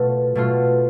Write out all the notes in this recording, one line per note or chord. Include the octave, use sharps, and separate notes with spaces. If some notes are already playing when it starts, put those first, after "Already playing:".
Already playing: B2 A3 F4
B2 A3 F4